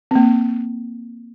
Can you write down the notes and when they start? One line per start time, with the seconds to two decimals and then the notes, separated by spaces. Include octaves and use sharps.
0.11 A#3 C4